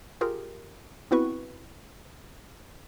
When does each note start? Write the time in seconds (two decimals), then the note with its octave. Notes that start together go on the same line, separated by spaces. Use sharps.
0.21 F4 G4 G#4 A#4
1.11 B3 C4 E4 F#4 B4 C#6